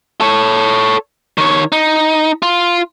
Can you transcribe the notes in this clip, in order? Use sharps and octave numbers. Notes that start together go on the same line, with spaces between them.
A4 C#5
D#3 C#5
D#4
F4